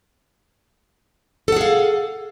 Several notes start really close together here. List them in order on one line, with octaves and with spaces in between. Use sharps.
A4 F#5 G#4 F5